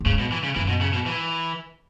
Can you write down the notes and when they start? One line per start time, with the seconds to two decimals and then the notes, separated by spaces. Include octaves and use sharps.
0.01 B2
0.06 G#2 C#3
0.19 B2
0.32 E3
0.44 C#3
0.56 F#2 E3
0.68 B2
0.81 C#3
0.93 B2
1.06 E3